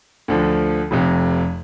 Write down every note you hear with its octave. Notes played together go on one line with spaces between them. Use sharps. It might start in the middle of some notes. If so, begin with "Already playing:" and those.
D2 D3 F3
F1 F2 C3